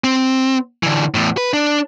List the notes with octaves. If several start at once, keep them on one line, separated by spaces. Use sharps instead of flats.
C4
D3 E3
E2 A2
B4
D4